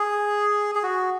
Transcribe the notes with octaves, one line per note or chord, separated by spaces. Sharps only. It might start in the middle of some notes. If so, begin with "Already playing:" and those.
Already playing: G#4
G#4
F#4